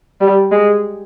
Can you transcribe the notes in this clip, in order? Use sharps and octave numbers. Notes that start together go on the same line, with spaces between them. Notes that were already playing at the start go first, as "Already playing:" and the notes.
G3
G#3